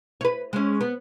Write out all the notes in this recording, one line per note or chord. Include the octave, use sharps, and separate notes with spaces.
B4 C#5
G#3 C#4
B3